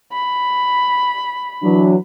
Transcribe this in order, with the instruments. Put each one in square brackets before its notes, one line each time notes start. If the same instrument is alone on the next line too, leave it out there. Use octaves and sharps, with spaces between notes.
[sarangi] B5
[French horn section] E3 F#3 D4